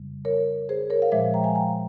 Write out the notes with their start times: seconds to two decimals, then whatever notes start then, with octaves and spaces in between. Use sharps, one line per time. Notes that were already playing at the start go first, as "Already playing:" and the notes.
Already playing: F2 C#3 G3
0.25 A#4 C#5
0.69 G#4 C5
0.90 A#4 C#5
1.02 F5
1.12 A#2 F3 G#3 C5 E5
1.34 G5 A#5
1.44 F5 G#5
1.55 G5 A#5